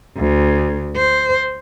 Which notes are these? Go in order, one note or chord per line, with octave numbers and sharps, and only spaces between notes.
D2
C5